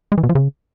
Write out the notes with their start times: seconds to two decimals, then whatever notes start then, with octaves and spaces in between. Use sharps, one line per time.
0.12 G#3
0.18 E3
0.23 B2
0.29 F3
0.35 C#3